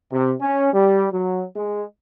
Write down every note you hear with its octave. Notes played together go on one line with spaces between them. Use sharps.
C3
C#4
G3
F#3
G#3